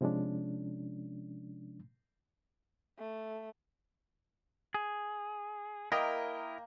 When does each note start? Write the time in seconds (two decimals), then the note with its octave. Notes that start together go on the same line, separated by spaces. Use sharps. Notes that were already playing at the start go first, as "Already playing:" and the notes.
0.01 C3 F3 G#3 C#4 D4
2.98 A3
4.74 G#4
5.92 A#3 E4 A#4 D#5 G5